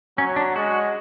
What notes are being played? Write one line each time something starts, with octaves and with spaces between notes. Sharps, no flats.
F#3 C#4
D4
G#3 F#4